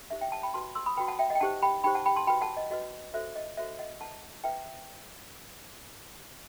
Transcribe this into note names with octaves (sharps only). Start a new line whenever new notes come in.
D#4 G4 C5 E5
E5 G5
F#5 A5
G5 B5
F#4 B4 A5 C6
C6 E6
B5 D#6
F#4 B4 G5 B5
F#5 A5
E5 G5
D#5 F#5
G5
D#4 G4 C5 F#5 A5
G5 B5
D#4 G4 C5 G5 B5
F#5 A5
G5 B5
A5 C6
F#4 B4 G5 B5
F#5 A5
D#5
F#4 B4 D#5
F#4 A4 C5 E5
D#5
F#4 A4 C5 E5
D#5 F#5
E4 B4 F#5 A5
E4 B4 E5 G5